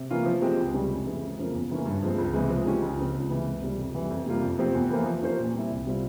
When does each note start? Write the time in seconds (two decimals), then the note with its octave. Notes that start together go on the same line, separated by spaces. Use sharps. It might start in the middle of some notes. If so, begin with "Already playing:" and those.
Already playing: C3
0.10 E3 A#3 C#4 F4
0.26 F3
0.42 G#3 C4 G4
0.58 C#2
0.74 C3 G3 C#4
0.90 F2
1.05 C#3 E3 G#3
1.22 F2
1.38 C#3 F3 A#3
1.54 E2
1.70 C#3 E3 A#3 C#4
1.86 G2
2.03 F3 G#3 C4
2.18 C#2
2.33 C3 E3 G#3
2.50 F3
2.65 G#3 C#4 G4
2.82 C#2
2.98 C#3 F3 C4
3.15 C#2
3.30 C3 E3
3.47 C#2
3.62 C3 G3 C4
3.78 F2
3.95 E3 G3
4.10 F2
4.26 C3 G3 A#3 F4
4.42 F2
4.58 C3 F3 C4 G4
4.75 E2
4.90 E3 A#3 F4 C5
5.06 F3
5.23 A#3 C#4 G4 C5
5.38 A#2
5.53 G3 C4 E4
5.70 C2
5.86 C3 G3 C4 F4